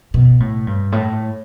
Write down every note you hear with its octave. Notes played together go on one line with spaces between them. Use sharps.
B2
A2
G2
A2